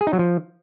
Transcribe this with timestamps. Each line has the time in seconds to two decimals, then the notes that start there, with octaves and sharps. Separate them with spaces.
0.01 G#4
0.07 D#4
0.13 F#3
0.19 F3